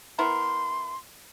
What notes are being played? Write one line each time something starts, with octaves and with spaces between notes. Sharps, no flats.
B3 E4 A#4 C6